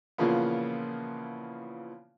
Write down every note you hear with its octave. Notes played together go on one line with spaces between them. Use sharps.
A#2 C#3 E3 F3 A#3 B3